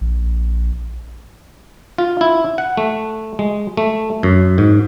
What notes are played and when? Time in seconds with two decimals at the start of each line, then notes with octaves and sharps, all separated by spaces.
0.01 A#1
1.98 F4
2.21 E4
2.58 F#5
2.77 A3
3.39 G#3
3.77 A3
4.23 F#2
4.58 G#2